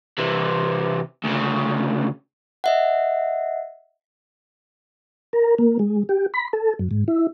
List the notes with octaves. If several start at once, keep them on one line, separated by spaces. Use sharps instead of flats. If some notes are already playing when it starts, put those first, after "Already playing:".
C3 E3
D2 C#3
D#5 E5 F#5
A#4
A#3
G#3
G4
B5
A4
F#2
G#2
E4